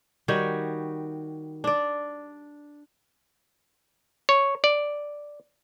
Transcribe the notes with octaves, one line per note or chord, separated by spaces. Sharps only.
D#3 G3 F#4 C#5
D4 D5
C#5
D5